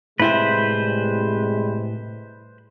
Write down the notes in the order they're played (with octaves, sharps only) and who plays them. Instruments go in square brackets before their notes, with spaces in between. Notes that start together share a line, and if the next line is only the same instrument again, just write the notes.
[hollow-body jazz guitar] A2 E4 G#5 [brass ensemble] C3 G3 G#3 [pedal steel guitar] B4 C5